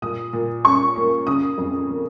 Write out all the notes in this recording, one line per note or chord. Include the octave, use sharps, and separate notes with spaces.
A#2 D#6
A#2
C#4 C#6
A#3
C#3 D#6
F2
A#3